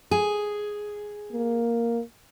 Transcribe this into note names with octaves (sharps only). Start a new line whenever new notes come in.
G#4
A#3